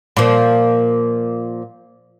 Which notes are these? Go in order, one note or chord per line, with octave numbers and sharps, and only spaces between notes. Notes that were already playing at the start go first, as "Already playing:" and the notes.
A#2 F3